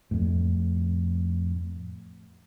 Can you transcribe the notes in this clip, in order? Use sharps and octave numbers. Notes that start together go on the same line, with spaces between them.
F2 A2